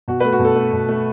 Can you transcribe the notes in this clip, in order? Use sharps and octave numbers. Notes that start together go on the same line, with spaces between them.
B2 F#4
B4
A3
F#4
B2
A4
A3
B2
A3